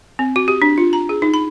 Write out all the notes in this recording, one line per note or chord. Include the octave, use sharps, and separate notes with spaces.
C4
F#4
G4
D4
F4
A#5
G#4
D#4
B5